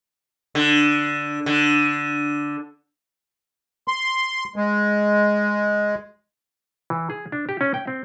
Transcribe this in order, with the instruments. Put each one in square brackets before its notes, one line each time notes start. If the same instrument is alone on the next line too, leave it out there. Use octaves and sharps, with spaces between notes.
[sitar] D3
D3
[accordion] C6
G#3
[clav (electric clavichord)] E3
G#4
D4
G4
C#4
G5
C4